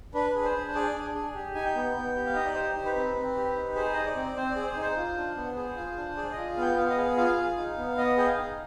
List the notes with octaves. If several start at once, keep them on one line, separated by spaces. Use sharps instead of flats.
D4 B4
G#4
C5
D4
G#4 D5
D4
G#4
G4
D#4 G#5
G5
B3
B3
G4
F5
D#4 D#5
D5
G4 C5
D#4
B4
C4
C4
G4
D#4
G#4 C5
D#4 D#5
D5
C4
C4 C5
D5
G#4
C5
D#4
C5
F4
D4
B3
G#4
F4
D4
G#4 D5
F4 D#5
B3 F5
G5
B3 F5
D#5
G#4 F5
F4 F5
G#4
D#4
B3
B3 D#5
G#4 G5
F5
D#4